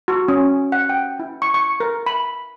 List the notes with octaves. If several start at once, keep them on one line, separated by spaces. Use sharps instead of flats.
F#4
C#4
F#5
G5
E4
C#6
C#6
A#4
B5